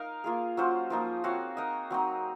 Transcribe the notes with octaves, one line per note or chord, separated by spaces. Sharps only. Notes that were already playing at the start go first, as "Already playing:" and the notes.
Already playing: D#4 A#4 F5
A#3 F4 G#4
F#3 C#4 F4 C5
F3 A#3 D#4
C4 F#4 C#5 F5
D#4 A#4 D#5
F#3 C4 D#4